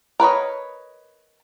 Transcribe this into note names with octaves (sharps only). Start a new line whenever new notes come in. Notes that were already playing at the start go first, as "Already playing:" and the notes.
A#4 B4 C#5 D#5